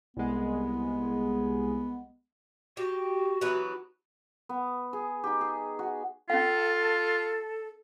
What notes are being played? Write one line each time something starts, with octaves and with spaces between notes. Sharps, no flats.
C2 G#3 B3
F#4 G4
E3 F#3 B3
B3
G#4
D#4 G4
G#4
F#4
C#4 F4 A4 F5